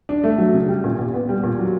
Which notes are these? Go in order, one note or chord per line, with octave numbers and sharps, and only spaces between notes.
D4
A3
F#3
C#3
G3
A#2
A#2
B3
G3
A#2
F#3